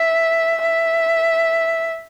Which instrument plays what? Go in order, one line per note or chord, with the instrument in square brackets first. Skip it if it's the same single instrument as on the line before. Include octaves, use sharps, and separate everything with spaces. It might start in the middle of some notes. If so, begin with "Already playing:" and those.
Already playing: [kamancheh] E5
E5